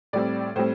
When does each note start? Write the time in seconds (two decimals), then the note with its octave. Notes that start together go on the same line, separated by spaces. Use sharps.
0.13 A2 G3 C4 D5
0.56 A2 G3 C4 C5